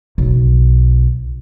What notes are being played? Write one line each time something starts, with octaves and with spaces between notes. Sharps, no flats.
B1